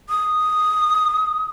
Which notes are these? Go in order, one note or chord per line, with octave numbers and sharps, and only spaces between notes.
D#6